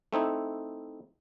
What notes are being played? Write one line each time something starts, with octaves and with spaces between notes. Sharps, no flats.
A3 C4 D#4 E4